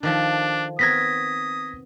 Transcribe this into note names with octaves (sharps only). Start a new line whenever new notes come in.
D#3 F3 D4 A4
B3 C4 A#4 D#6 G#6 A#6 B6